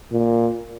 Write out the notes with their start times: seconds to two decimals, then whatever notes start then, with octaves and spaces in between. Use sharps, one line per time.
0.12 A#2